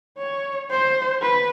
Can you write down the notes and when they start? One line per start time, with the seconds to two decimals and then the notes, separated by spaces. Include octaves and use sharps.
0.18 C#5
0.71 C5
1.22 B4